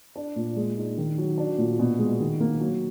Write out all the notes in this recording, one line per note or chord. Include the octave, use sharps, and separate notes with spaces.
D4
A#2
G#3
D#4
D#3
F#3
D4
A#2
B2
G#3
D#3
A#3
F#3